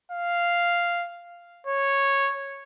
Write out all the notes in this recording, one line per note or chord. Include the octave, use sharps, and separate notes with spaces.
F5
C#5